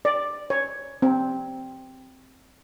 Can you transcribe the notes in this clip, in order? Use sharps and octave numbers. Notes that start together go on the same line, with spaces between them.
D5
C#5
C4